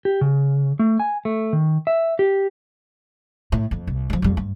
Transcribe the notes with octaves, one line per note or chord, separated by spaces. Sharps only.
G4
C#3
A3
G#5
A3
D#3
E5
G4
A2
F2
C2
F3 G3
F2 G3
G2